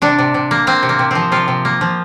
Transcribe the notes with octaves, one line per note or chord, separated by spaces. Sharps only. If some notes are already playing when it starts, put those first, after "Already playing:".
C3 D4
C3
C3
A#3
A#3 C4
C3
A#3
C3
F3 C4
C3 F4
C3
A#3
F3